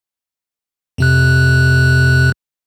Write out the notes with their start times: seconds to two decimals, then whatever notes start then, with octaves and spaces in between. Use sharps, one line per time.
0.98 F2 C3 F#6